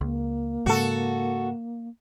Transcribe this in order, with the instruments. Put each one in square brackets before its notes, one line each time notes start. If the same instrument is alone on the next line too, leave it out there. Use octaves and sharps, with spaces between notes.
[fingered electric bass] C#2 [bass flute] A#3
[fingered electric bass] G#2 C#3 G#3 [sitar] F#4 A4